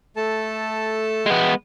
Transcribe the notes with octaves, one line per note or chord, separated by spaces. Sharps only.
A3 A4 A5
G#3 B3 G5